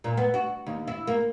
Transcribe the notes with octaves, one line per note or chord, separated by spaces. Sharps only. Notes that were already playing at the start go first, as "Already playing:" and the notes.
A#2
B3
F#4
D#2
E4
A#3